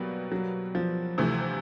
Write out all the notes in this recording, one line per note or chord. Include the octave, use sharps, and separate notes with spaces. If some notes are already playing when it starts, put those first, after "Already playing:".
Already playing: B2 F#3 G3 A#3
F#3
F3
D2 C3 E3 A3